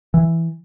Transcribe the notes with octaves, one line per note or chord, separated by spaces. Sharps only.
E3